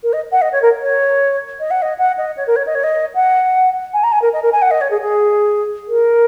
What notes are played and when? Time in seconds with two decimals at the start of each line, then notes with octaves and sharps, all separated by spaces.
0.03 A#4
0.13 D#5
0.32 F#5
0.41 D#5
0.52 C#5
0.62 A#4
0.81 C#5
1.59 D#5
1.70 F#5
1.82 D#5
1.98 F#5
2.17 D#5
2.36 C#5
2.47 A#4
2.56 C#5
2.66 D#5
2.75 C#5
2.83 D#5
3.15 F#5
3.93 G#5
4.03 A#5
4.12 G#5
4.22 A#4
4.33 D#5
4.42 A#4
4.52 G#5
4.62 F#5
4.71 D#5
4.81 C#5
4.90 G#4
5.01 G#4
5.88 A#4